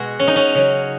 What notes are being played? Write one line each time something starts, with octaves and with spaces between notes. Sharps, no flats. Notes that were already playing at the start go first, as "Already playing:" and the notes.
Already playing: B2 G#3 F#4 G#4
C#4
D#4
C#4
C#3 F#3